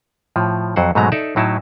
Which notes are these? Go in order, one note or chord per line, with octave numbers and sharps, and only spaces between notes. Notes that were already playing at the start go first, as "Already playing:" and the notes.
A2 F3
F2 F#3 C5 F#5
G#2 B2 F#3 G#3 A3 A#5
D#4 A4 D5 E5
A2 F#3 D#4 E4 A5